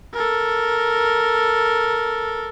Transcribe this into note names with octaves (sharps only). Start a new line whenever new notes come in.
A4 A#4